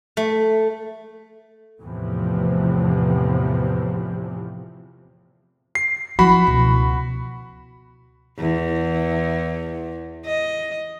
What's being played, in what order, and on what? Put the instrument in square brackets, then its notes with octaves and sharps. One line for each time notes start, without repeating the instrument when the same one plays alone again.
[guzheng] A3
[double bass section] E2 A2 C3 E3 F3
[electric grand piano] C7
[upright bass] F3 E4 [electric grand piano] F#4 B5
[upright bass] C#2 B2
[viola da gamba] E2
D#5